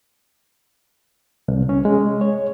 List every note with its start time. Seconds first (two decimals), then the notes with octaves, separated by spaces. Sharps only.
1.48 C2
1.69 C#4
1.85 G#3
2.21 C#5